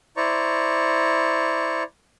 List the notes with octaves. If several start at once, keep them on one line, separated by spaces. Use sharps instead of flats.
E4 C5 D5 A#5 C#6